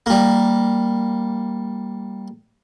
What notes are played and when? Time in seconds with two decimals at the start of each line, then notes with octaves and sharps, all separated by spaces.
0.06 G3 A#3